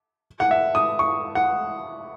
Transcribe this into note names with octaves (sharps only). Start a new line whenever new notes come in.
F#5
E5
D#6
C#6
F#5